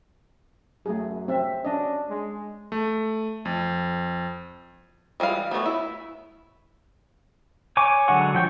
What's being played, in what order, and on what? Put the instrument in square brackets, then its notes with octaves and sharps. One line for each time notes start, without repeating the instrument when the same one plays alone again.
[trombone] F#2 [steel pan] A3 G#4
[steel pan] C4 E5
[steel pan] C#4 D#5 [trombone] D4
[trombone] G#3
[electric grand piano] A3
F2
[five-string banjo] E3 G3 G#3 F5
A3 B3 G#4 C#5
E4
[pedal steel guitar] C#5 G#5 C#6 D6
D3 F#3 G#3 F#5 C#6
F3 G5 C#6